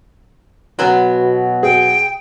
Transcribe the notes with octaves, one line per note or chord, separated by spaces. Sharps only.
B2 F#3 B3
G#4 G5